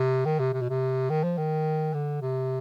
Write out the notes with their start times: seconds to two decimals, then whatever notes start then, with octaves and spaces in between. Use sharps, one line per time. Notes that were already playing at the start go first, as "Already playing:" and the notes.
Already playing: C3
0.26 D#3
0.39 C3
0.53 C3
0.61 B2
0.70 C3
1.10 D#3
1.24 F3
1.38 D#3
1.94 D3
2.22 C3